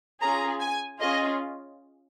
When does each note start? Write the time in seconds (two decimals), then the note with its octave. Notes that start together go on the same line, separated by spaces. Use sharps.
0.21 C#4 F4 G#4 A#5
0.60 G#5
1.00 C#4 F4 G#4 D#5